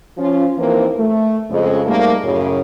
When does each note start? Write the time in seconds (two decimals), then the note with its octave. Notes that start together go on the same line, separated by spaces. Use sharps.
0.18 F3 C#4 F4
0.58 D#2 E3 F3 A#3 C4 A#4
0.98 A3
1.51 F2 C#3 G#3
1.85 G#2 G3 A3 A#3
2.23 F#2 A2 C#3